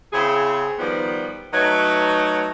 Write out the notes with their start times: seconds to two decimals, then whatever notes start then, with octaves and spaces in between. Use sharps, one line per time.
0.12 C#3 C4 E4 G#4
0.78 D#3 F3 G3 B3
1.53 F#3 A3 D#4 B4 C#5